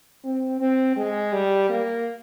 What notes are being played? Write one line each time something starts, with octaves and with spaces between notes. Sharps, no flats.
C4
C4
G#3
G3
A#3